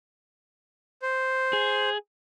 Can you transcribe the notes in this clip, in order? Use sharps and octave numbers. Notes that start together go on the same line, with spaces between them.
C5
G#4